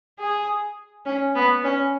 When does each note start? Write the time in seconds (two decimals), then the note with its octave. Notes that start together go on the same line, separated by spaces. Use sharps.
0.19 G#4
1.06 C#4
1.35 B3
1.64 C#4